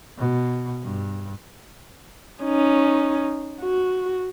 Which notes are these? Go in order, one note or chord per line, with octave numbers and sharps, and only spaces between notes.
B2
G2
C#4 D#4
F#4